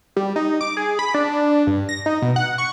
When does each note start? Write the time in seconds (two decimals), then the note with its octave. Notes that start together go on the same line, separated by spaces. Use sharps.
0.16 G3
0.36 D#4
0.61 D6
0.77 G#4
0.99 B5
1.14 D4
1.67 G2
1.89 A#6
2.06 D#4
2.22 B2
2.36 F#5
2.58 C#6